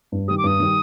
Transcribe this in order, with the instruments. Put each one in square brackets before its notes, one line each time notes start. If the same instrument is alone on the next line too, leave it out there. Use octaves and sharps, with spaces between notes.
[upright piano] G2
[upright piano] D#3 G3 [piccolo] D#6
[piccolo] D6
[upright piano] G2 [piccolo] D#6
[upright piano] D#3 G3